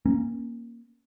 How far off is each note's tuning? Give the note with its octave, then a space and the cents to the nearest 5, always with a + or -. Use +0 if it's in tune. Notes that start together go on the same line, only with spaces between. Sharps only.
A#3 +5 C#4 -20